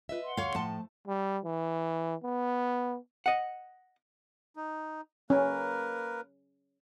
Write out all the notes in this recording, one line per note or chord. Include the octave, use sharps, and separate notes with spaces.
F4 B4 D#5 E5
F#5 C6
D2 C#5 F5
A2 F3 A3 A5
G3
E3
B3
D#5 F#5
D#4
A#3 C#4 A#4 B4